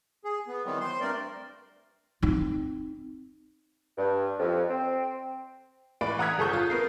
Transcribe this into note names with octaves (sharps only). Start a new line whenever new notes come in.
G#4
B3
D#3 E3 F#3 G3 B3 C4
C5 C6
G2 A3 C4 A#4 D5
C4 D#4
G2
F2
C4
A2 E3 B4 D5 B5 D7
F#5 A#5 D#6 F#6 G#6 B6
G1 G#4 A4 C#6 G6
F4
B3 A#4 C7